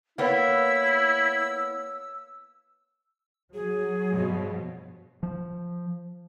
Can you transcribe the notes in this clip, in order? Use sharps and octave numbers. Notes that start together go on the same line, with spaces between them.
A#3 B3 E4 C#5 F5 E6
F#3 G#4
G2 B2 F3
F3